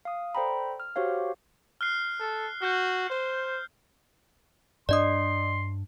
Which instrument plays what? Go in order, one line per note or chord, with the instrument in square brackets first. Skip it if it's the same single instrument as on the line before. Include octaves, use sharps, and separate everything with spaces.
[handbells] F5 D#6
A4 C5 D5 G5 A#5 B5
F6
F#4 G4 C5 C#5 F5
[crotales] F6 F#6 C7
[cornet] A4
[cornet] F#4 [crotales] F6 G6
[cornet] C5
[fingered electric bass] G2 D4 [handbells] D5 D#5 D#6 [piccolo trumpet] C6